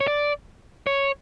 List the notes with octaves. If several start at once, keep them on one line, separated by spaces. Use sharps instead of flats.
C#5
D5
C#5